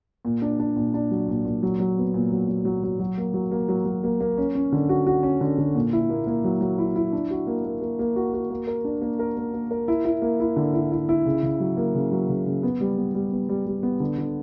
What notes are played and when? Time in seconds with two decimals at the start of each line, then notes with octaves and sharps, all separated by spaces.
0.25 A#2
0.42 D4
0.60 D4
0.76 A#2
0.94 D4
1.11 F#3
1.28 A#2
1.45 A#2
1.63 F#3
1.80 F#3
1.97 B3
2.14 A#2
2.32 F#3
2.49 F#3
2.65 F#3
2.83 F#3
2.99 F#3
3.18 A#3
3.34 F#3
3.52 A#3
3.69 F#3
3.85 F#3
4.04 A#3
4.21 A#3
4.38 C#4
4.55 C#4
4.72 D3
4.89 F#4
5.07 F#4
5.23 C#4
5.41 D3
5.58 D3
5.75 A#2
5.93 E4
6.09 A#3
6.27 A#3
6.44 F#3
6.61 F#3
6.78 E4
6.96 E4
7.13 D4
7.31 F#4
7.47 A#3
7.64 A#3
7.81 A#3
7.99 A#3
8.16 F#4
8.34 F#4
8.50 A#3
8.67 A#4
8.85 D4
9.02 A#3
9.19 A#4
9.37 A#3
9.53 A#3
9.71 A#4
9.88 E4
10.05 E4
10.22 A#3
10.40 E4
10.56 D3
10.74 E4
10.92 E4
11.09 E4
11.25 C#3
11.43 C#3
11.60 F#3
11.77 A#3
11.95 C#3
12.12 F#3
12.29 C#3
12.46 C#3
12.63 B3
12.81 G3
12.98 B3
13.15 G3
13.32 B3
13.49 G3
13.67 G3
13.83 B3
14.00 D3
14.18 D3